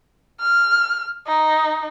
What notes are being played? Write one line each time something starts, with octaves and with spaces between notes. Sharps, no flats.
F6
D#4